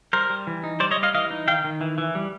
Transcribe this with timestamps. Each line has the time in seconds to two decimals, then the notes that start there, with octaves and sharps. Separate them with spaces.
0.13 G3 A#4 C5
0.30 G3
0.47 E3
0.64 D#4
0.80 G3 C5 D5
0.91 C#5 D#5
0.97 G3
1.03 D#5 F5
1.14 E3 D#5 F5
1.31 D#4
1.48 D#3 F5 G5
1.64 D#3
1.81 E3
1.98 E3
2.15 G3